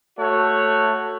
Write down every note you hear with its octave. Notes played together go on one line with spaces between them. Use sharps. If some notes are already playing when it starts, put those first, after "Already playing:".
A3 F#4 C#5